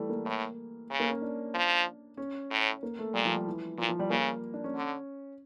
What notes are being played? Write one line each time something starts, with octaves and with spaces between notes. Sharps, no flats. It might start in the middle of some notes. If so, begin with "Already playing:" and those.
Already playing: E3 G3 A3
A#3
A2
C#3
A#3
C#4
D4
F3
C#4
A2
A#3
A3
A#2 G3
F3
G3
E3
A#2 F3
F3
G3
C#3 A#3
D4
C#4
D3